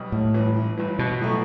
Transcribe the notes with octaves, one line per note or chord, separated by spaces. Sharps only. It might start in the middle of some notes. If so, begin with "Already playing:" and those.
Already playing: B1 B2 G3
A2
G1 G2 E3
G1 G2 E3
B2
A2 F#3 A3